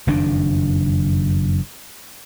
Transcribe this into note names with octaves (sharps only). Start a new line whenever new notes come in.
F#1 F2 D#3 D4